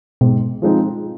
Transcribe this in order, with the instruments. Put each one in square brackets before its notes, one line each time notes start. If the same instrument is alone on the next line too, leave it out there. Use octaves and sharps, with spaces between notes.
[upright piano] G#2 [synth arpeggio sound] B2
[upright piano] F3 G#3 C4 D#4